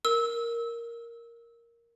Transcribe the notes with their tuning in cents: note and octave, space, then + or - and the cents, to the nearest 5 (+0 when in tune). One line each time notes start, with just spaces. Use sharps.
A#4 +0 E6 -20